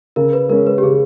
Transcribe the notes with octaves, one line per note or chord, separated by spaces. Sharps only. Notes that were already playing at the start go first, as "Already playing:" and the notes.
C#3 A#4
B4
G#3 C#4 A#4
B4
G4
C#3 G#4